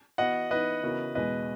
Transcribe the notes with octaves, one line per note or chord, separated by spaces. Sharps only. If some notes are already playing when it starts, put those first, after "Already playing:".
E3 B3 F#4 B4 D#5 F#5
E3 B3 D#4 B4 D#5
C#3 E3 B3 F#4 A#4
E2 B2 G#3 B4 D#5